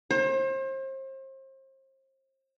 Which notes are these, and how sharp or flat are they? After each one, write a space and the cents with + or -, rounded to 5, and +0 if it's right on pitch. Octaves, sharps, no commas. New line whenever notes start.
C5 +35